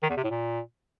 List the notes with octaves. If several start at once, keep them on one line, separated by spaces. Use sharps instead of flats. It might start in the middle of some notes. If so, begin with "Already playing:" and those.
D#3
E2
C3
A2
A#2